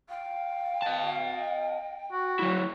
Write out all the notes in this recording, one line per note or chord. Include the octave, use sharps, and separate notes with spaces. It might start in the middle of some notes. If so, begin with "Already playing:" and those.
F5 G5
D#5 A5
F#4
F#3 E4